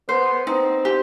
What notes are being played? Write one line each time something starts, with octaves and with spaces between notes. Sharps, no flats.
B3 C5
C4 D#4
G4